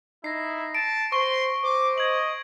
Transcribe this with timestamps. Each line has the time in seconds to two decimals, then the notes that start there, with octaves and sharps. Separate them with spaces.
0.24 D#4 E4 A#6 C7
0.75 A5 D7
1.12 C5 C6 C#6
1.64 C5 D6
1.98 D#5 G#6 F#7